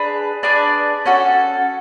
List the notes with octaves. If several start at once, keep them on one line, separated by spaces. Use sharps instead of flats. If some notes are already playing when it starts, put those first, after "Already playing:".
Already playing: D4 G#4 B4
D4 G#4 B4 D5
C#4 F#4 A4